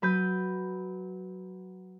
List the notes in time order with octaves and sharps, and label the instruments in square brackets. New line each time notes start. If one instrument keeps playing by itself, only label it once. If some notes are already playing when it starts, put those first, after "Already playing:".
[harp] F#3 B4 G6